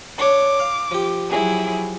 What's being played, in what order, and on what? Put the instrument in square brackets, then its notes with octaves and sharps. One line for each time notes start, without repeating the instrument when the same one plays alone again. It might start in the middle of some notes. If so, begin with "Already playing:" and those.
[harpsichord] D4 C#5 [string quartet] D6
[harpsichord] F5
F3 G4
[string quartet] F#3 E4 G#4